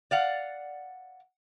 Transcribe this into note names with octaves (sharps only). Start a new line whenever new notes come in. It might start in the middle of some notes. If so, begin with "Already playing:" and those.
D5 F5 F#5